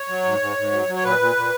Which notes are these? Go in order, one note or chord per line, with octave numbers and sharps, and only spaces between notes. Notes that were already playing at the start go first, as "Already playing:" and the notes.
Already playing: C#5
F#3
G#2
G#2
G#2
F#3
F#3
C#5
A#2 B4
A#2
A#2